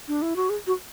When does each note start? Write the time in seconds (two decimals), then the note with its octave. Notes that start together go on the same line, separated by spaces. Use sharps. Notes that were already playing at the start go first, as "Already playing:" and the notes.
0.08 D4
0.22 E4
0.36 F#4
0.50 G#4
0.67 F#4